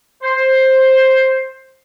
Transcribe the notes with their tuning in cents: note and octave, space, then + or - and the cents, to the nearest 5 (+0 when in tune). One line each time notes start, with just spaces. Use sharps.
C5 +10